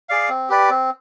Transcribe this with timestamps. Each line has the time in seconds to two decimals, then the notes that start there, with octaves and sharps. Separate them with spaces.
0.09 G#4 D5 F5
0.29 C4
0.49 G4 B4 D5
0.70 C4